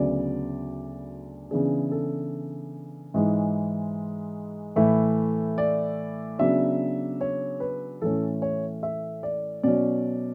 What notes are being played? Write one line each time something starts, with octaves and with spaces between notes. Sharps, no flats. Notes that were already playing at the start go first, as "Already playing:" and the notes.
Already playing: D2 C#3 F#3 B3 D5
C#3 E3 B3 D4 G#4
A4
G#2 E3 G#3
A2 E3 A3 E4
D5
C#3 F#3 B3 D4 E5
C#5
B4
A2 E3 A3 C#4 A4
C#5
E5
D5
B2 F#3 C#4 D5